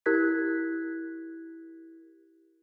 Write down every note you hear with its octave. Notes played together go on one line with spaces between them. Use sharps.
E4 G4 A#4 F#6 G#6 B6